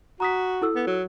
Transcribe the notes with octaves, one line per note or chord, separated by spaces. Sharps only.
F#4 A#5 D#6 B6
E4 A4 E6
B3
F#3